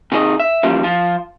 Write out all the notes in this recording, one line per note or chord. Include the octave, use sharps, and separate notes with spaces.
C3 D#3 G#4 C5 D#5
E5
E3 F3 G3 A#3 C#4
F3 F4